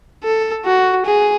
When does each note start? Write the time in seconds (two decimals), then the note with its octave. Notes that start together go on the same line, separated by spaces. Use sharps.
0.24 A4
0.66 F#4
1.06 G#4